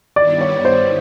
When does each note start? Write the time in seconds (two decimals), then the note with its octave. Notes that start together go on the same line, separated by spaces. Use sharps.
0.16 G2 D#3 G3 B3 E4 D5
0.41 C#5
0.65 C5